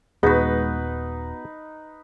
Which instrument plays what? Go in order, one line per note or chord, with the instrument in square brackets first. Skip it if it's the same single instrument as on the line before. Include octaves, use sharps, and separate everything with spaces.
[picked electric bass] D#1 [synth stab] G#3 [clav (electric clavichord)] B3 F#4 [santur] D#4 B4